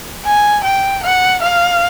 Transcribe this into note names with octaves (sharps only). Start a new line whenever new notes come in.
G#5
G5
F#5
F5